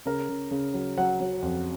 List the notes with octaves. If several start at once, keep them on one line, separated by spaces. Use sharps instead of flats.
C#3 A#4
C#3
C#3
F#3
F#3 F#5
F#3
F2